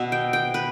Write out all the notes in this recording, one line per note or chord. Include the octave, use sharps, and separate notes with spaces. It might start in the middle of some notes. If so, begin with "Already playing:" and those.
Already playing: B2 B3 E5
G5
G5
B4